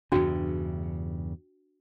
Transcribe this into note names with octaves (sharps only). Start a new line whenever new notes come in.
E2 G2 C#3 D4 F#4 G5